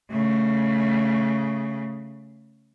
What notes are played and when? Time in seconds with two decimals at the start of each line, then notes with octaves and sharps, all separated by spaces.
0.11 C#3 A3